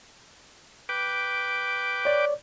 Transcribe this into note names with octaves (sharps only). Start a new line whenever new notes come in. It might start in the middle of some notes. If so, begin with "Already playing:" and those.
B4 G5 D6
C#5 D5